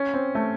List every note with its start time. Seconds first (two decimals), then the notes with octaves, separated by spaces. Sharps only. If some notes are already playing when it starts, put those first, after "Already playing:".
Already playing: C#4
0.14 C4
0.35 A3